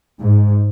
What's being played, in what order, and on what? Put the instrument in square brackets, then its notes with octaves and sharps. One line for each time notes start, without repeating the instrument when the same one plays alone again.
[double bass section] G#2